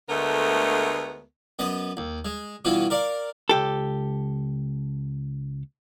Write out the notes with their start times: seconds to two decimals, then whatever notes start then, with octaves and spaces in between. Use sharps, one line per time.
0.10 D2 D3 G#3 A3 B3 A#4
1.59 F#2 B3 D#5
1.97 D#2
2.25 G#3
2.65 G2 B2 E3 F4 F#4
2.90 A#4 D5 F5
3.49 C#2 G4 A4